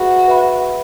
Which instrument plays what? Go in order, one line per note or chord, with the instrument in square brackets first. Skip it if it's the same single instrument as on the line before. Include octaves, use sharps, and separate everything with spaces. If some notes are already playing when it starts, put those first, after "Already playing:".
Already playing: [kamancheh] F#4 [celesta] G#4 B4 E5 B5
[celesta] B4 E5 B5